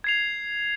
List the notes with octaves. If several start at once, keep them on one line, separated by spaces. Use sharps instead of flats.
G#6 C7 F7